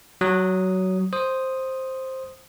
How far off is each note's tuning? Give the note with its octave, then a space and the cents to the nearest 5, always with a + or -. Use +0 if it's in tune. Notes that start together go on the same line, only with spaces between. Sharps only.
F#3 +15 D#6 +0
C5 +5 D#6 +0